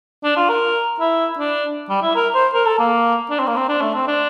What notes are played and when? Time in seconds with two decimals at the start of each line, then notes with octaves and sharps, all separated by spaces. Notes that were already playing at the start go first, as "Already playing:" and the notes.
0.24 D4
0.37 F4
0.49 A#4
1.00 E4
1.39 D4
1.90 G3
2.02 E4
2.16 A#4
2.35 C5
2.54 A#4
2.66 A4
2.79 A#3
3.31 D4
3.40 C4
3.47 A#3
3.56 C4
3.69 D4
3.81 A3
3.95 C4
4.07 D4